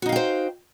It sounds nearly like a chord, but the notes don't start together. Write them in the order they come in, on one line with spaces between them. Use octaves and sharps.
F#4 D#4 F5 G5 C5